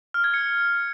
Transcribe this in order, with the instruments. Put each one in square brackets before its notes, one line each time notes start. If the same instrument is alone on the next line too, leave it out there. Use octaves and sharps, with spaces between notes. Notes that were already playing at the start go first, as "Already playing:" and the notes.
[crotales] F6
G#6
C#7